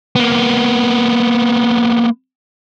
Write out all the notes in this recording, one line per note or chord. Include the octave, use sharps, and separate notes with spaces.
A#3 B3